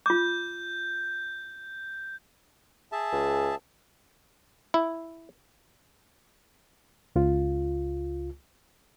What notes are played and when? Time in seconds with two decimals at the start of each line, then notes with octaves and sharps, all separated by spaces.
0.06 F4 D6 G6
2.92 G#4 E5 A5
3.13 C#2
4.74 E4
7.16 C#2 F4